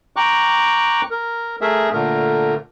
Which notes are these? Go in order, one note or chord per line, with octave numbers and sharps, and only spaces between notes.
G5 A#5 C#6 D6 F#6
A#4
A3 G#4 A#4 E5
A#2 D3 A3 A#4